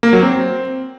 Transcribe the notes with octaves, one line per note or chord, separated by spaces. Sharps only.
A#3
F#3
C4